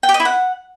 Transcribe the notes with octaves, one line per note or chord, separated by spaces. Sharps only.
G5
G4
D#5
E4
F#5